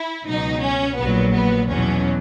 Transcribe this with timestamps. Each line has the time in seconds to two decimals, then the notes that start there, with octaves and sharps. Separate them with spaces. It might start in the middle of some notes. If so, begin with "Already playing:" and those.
Already playing: E4
0.27 C#2 B2 F#3 D#4
0.63 C#4
0.98 A#1 A#2 F#3 B3
1.34 B3
1.69 E2 B2 F#3 C#4